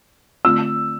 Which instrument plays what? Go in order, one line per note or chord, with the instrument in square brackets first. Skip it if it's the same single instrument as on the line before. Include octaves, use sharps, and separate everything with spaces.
[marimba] D3 A3 C4 F4 [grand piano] E6